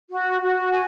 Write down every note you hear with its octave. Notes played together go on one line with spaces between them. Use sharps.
F#4
F#4
G#5